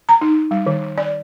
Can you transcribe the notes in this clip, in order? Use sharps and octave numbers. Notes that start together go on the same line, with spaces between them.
A#5
D#4
G3
D#3
D5